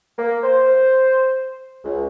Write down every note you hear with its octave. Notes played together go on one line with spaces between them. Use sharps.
A#3
C5
C#2